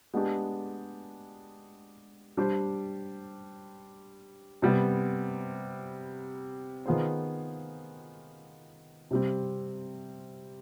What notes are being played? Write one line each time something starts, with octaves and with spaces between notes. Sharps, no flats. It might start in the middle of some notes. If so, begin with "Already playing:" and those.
G#3 B3 D4 G4
G3 D4 G4 C5
C3 G3 B3
D#3 B3 F4 G#4 C5
C3 G3 C4